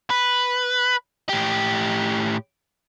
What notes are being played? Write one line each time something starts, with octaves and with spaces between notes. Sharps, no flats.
B4
A2 G4